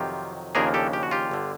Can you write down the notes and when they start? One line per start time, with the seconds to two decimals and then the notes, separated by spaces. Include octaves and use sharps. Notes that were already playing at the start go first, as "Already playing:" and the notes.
Already playing: F2 C3 D#3 F#3 F4 G4
0.55 D#2 C#3 F3 A#3 D4 G#4 A#4
0.74 G4 A4
0.93 G4
1.03 F#4
1.11 F4 G4
1.31 G1 D3